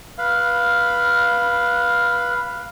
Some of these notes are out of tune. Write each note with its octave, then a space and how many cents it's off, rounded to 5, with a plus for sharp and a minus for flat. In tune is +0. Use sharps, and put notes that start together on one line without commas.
B4 -15 F5 +0 B5 +0